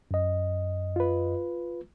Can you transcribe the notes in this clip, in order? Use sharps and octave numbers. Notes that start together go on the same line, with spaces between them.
F#2 D#5
F4 B4